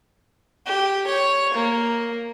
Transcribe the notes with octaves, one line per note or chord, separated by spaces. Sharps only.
G4
C#5
A#3